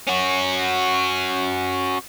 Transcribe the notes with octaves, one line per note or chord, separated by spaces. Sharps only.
C#4 F#4